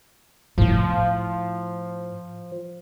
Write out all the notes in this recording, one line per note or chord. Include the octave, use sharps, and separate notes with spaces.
A2 F3 E4